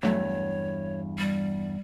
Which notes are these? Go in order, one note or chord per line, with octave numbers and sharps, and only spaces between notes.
E2 G2 F#3 A3 C#5
G3